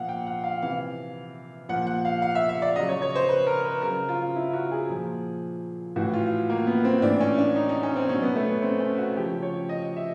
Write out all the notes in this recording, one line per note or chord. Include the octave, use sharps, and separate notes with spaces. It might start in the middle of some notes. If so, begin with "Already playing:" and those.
Already playing: A#2 F3 F5 F#5
G5
F#5
F5
C3 E3 F5
A#2 F3 F#5
F#5
F5
F5
E5
E5
D5
C#3 F#3 D#5
C#5
C#5
C5
B4
A#4
B4
C#3 F#3 A#4
F4
E4
F#4
G#4
A#2 F3
A2 E3 F#4
F4
A#3
B3
C4
A2 E3 D4
C#4
D4
D#4
D#4
C#4
C4
B2 F#3 C#4
B3
A3
B3
C4
C#4
F#4
C#3 F3 G4
C#5
D#5
E5